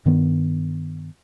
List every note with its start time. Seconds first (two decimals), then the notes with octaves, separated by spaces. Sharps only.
0.06 G2 D#3 B3